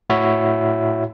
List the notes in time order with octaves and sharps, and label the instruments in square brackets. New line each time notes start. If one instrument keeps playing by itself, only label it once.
[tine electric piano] A2 E4 F#4 C#5 E5